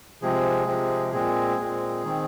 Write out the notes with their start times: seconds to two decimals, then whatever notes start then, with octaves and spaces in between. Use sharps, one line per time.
0.22 C3 F3 G#3 C4 G#4
0.67 C3 F3 G#3 C4
1.12 A#2 G#3 C4 G#4
1.58 A#2 G#3 C4
2.04 D#3 C4